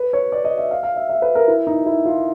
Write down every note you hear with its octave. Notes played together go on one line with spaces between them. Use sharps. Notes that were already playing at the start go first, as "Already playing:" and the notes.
Already playing: B4
C#5
D5
D#5
E5
F5
F5
E5
E5
B4
A#4
E4
D#4
E4
F4